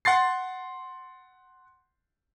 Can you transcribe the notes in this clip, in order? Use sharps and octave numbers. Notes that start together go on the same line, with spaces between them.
F#5 C6 A6 C7